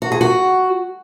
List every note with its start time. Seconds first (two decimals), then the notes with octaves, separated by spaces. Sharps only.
0.02 F#4
0.12 G#4
0.21 F#4